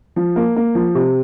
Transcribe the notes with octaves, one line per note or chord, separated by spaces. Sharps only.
F3
A#3
A#3
F3
C3